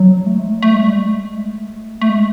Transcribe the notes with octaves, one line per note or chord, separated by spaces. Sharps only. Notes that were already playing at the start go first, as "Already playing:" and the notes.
Already playing: F#3
A3
G#3
A3
A3
G#3
G3
G#3
A3
A3
G#3